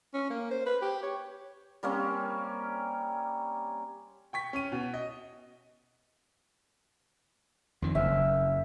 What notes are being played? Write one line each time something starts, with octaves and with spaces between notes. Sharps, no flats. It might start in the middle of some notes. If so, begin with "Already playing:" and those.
C#4
A#3
C5
B4
G4
C#5
G3 A#3 C4 C#4
G5 C#6 B6
C#4 C#6 D#7
B2
D#5
F2 D#3
F#1 F#2 E5